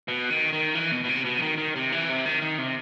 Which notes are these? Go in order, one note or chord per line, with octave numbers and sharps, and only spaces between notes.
B2
D#3
D#3
E3
B2
B2
C3
B2
E3
D#3
D#3
C3
E3
C3
D#3
D#3
C3